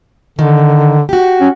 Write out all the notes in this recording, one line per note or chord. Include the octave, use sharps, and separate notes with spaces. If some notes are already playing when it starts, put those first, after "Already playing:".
D3 D#3
F#4 G4
C#4